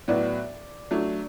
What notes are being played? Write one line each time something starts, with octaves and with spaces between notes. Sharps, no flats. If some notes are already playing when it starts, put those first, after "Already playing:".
A2 F#3 B3 F#4 D5
F#3 A3 D4